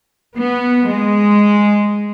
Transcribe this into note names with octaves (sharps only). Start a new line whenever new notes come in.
B3
G#3